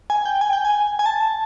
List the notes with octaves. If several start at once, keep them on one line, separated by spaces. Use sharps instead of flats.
G#5
G5
G#5
G5
G#5
G#5
A5